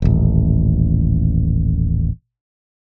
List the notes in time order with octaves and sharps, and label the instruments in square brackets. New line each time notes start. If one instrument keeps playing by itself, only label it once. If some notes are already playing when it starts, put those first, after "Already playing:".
[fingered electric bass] D#1 A1